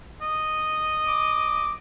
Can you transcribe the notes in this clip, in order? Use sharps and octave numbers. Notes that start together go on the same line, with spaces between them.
D#5
D6